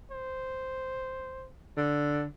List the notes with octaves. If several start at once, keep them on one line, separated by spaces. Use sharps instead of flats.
C5
D3